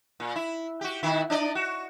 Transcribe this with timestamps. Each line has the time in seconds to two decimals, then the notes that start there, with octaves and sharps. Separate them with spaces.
0.20 A#2
0.36 E4
0.81 F#4 G4
1.03 B2 D#3 E4
1.30 D4 D5 D#5
1.55 F#4